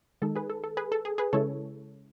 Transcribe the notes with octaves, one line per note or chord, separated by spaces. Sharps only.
D#3 G#3 D#4 A4
G#4 B4
A4
A4
G#4 B4
A4
G#4
G#4 B4
C#3 G#3 C#4 E4 A4 C#5